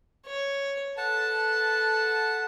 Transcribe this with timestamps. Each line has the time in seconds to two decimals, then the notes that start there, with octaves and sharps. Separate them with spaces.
0.25 C#5
0.98 A4 B4 F#5 A5